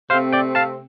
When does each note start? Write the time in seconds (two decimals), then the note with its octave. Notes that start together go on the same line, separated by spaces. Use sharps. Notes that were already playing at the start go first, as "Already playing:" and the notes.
0.10 C3 A3 C4 C5 F5
0.33 D5 G5
0.55 F5 A5